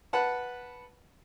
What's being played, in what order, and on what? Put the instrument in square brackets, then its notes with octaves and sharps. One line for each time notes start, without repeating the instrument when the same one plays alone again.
[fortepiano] B4 F#5 A5